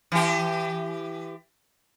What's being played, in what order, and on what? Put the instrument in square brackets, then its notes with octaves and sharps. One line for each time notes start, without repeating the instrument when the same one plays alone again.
[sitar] E3 G4